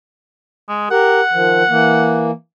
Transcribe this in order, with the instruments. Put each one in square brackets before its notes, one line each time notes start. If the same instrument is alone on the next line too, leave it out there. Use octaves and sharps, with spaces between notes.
[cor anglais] G#3
[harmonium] G4 A#4 [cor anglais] F#5
[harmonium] D#3 F3
E3 A#3